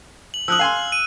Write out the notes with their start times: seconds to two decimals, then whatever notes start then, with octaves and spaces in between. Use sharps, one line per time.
0.34 F#7
0.48 F3 D#6 E6 F#6 F#7
0.59 F5 G#5 C6
0.92 D#7